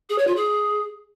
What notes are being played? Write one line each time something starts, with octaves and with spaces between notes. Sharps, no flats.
G#4
C#5
F4
G#4